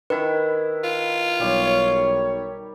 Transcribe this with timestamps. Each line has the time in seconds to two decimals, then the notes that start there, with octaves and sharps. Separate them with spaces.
0.10 D#3 E4 B4 B5
0.84 F4
1.40 B1 G3 C#5